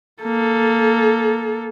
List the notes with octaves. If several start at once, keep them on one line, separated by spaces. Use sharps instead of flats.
A#3 A4